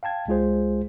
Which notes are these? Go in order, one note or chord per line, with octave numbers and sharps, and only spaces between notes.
F5 G5 A5 G#6
C#2 G#3 F4 G#4 C5